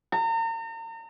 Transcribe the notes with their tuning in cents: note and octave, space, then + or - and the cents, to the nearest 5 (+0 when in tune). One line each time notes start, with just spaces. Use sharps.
A#5 -40